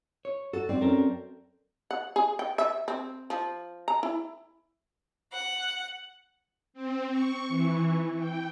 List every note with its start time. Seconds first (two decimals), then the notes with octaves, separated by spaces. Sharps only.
0.25 C#5
0.53 F#4 A4
0.69 G#2 C4 D5
0.81 F#2 A4 A#4
1.91 F#5
2.16 G#4
2.39 G5
2.58 E5
2.88 C4
3.30 F3
3.88 A#5
4.03 E4
5.31 F#5
6.74 C4
7.10 C#6
7.48 E3
8.17 G5